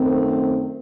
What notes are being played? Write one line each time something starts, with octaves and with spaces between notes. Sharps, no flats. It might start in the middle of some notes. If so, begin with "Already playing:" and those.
Already playing: F#2 D#3 A3 C4